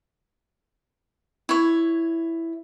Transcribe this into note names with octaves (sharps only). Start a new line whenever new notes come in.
E4 C#5